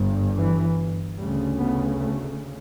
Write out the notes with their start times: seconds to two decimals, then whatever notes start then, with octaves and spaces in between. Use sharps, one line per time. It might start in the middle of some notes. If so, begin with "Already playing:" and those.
Already playing: G1 G2
0.37 E3
1.18 D2 C#3 G3
1.59 B3
2.00 A3